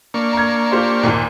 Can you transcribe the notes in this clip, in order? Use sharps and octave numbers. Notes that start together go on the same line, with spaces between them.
A#3 D4 C#6
A#5 G#6
F4 G4 C5
G#1 D#2 A#2